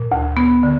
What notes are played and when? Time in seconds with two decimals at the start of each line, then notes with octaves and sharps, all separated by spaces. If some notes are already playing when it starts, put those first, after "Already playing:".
Already playing: A#2
0.12 D2
0.37 B3
0.63 D3